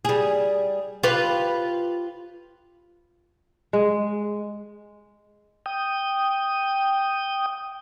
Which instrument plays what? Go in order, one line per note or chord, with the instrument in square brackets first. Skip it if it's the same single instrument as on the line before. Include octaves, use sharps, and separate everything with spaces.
[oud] G3 G#4
F4 G4 B4
[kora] G#3
[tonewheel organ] G5 D#6